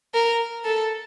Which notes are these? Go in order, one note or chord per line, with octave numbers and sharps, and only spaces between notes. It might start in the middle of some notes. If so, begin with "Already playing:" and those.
A#4
A4